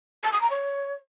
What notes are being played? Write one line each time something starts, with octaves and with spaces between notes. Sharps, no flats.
A5
D#6
A#5
C#5